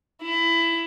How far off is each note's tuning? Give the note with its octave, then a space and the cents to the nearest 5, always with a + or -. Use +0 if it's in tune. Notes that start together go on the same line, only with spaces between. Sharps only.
E4 +15